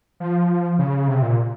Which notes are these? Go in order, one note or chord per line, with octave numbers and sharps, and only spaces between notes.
F3
C#3
C3
A#2